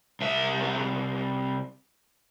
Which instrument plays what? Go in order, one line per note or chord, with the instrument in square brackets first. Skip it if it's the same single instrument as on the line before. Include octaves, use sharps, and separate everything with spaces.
[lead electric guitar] C2 E5